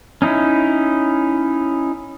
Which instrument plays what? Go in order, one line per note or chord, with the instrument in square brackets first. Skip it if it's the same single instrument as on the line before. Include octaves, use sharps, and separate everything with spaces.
[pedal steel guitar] C#4 D#4 E4